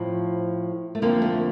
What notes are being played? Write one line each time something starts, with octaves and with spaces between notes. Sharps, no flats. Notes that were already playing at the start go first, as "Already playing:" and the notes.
Already playing: A2 F3 C4
A3
F2 D3 F3 A#3
A3